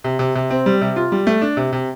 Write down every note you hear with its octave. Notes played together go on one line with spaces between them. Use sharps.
C3
C3
C3
C4
G3
C3
F4
G3
A3
D4
C3
C3